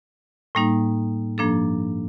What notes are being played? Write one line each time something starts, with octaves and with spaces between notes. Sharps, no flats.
A2 G3 A#3 D#4
G2 F3 A#3 D4 A4